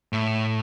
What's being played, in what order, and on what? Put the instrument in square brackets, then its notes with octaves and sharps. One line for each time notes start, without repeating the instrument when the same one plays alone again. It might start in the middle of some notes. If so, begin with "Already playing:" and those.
[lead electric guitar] A2